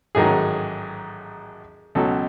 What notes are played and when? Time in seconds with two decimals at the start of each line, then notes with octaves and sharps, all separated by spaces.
0.15 A1 G#2 D#3 F#3 G#4
1.95 C#2 B2 F#3 A4